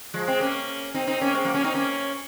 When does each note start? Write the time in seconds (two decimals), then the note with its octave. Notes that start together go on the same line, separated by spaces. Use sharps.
0.14 F3 G#3
0.27 G#3 C4
0.40 A#3 C#4
0.94 C4 D#4
1.07 C4 D#4
1.21 A#3 C#4
1.34 G#3 C4
1.44 F#3 A#3
1.54 A#3 C#4
1.64 C4 D#4
1.74 A#3 C#4